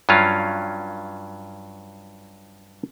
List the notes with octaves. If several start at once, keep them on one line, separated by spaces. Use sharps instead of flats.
G2 F#3 C#4 F4 F5